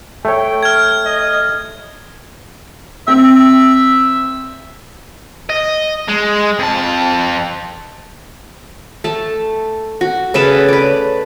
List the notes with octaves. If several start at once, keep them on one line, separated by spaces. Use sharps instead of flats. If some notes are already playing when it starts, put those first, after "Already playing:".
A3 C#5 G5
F6 G#6
D#5
C4 E5
D#5
G#3
F2 A5
A3 A5
F#4
C#3 A3 B4 A5
B4 D5